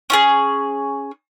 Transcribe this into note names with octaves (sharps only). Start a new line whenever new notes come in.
C#4 F4 G#4